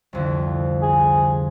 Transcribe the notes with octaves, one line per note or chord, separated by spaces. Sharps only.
C2 F2 D3
G#4